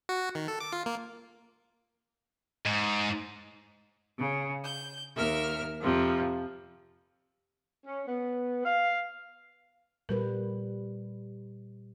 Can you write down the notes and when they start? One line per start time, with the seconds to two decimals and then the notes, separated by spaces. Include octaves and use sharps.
0.09 F#4
0.35 D#3
0.48 A4
0.60 D6
0.72 F4
0.86 A#3
2.66 G#2
4.19 C#3
4.64 G6
5.16 D#2 A#4 E5 F6
5.81 F2 C3 F3
7.86 C#4
8.08 B3
8.65 F5
10.09 A#2 G3 A#4 B4